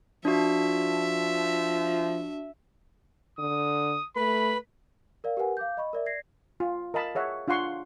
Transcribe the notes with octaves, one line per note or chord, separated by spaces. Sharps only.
F3 D4 F#4 E5
D3 D#6
A3 B4 B5
A#4 D5 F5
G4 A#4 B4 F#5 G#5
F5 D6 G6
D#5 B5 C#6
A#4 D5 E5
D5 G#6 A#6 C7
F4
A#4 D#5 F5 A5 B5
G#4 C#5 E5 F#5
D4 F4 F5 F#5 C6 C#6